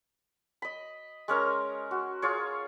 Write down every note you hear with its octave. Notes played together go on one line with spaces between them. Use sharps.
D#5 B5
G#3 C#4 A#4 A#5
F#4
F4 G#4 C#5